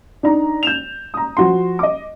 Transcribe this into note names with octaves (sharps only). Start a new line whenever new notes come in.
D4 D#4 A#5
G6 E7 F7
A#5 D#6
F3 F#4 C6
D#5 D6